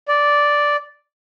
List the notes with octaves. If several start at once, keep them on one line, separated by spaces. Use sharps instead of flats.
D5